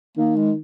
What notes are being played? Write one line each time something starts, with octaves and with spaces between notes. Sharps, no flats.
D#3 A#3
G#3